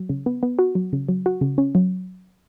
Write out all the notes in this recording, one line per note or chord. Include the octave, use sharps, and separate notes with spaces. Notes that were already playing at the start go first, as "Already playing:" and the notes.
Already playing: F#3
C#3
B3
B3
F#4
F#3
C#3
F#3
F#4
C#3
C#4
F#3